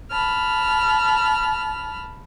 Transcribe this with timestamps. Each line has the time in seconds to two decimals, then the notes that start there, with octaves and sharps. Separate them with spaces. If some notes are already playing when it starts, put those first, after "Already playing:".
0.11 A5 B5 F6